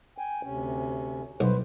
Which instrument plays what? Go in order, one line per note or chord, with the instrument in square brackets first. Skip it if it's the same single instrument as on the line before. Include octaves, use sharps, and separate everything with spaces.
[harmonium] G5 G#5
D2 C3 C#4
[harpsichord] B1 [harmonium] B4 C5